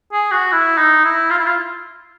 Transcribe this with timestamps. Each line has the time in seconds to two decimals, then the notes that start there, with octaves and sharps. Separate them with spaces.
0.13 G#4
0.32 F#4
0.52 E4
0.78 D#4
1.04 E4
1.30 F4
1.38 E4
1.47 F4